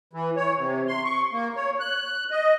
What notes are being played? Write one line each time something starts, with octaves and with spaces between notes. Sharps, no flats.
E3
C#5
C3
C6
C#6
A#3
C#5
F#6
D#5